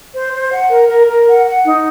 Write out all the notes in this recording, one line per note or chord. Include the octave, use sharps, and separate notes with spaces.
C5
C5
F#5
A#4
A#4
A#4
F#5
F#5
D#4